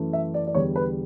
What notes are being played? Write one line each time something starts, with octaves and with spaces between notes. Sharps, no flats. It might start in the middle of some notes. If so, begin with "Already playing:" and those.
Already playing: F#2 E3 A3
E5
D5
D5
E2 D3 G3 C#5
B4